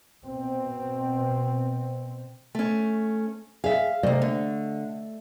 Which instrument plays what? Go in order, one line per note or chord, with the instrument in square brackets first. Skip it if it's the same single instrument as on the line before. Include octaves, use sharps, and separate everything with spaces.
[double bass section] B2 C4
[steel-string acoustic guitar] A3 C#4
[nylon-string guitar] G#4 E5 [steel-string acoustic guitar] F5
[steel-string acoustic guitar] C3 A#3 [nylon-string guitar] A3 D5 D#5
[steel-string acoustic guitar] D3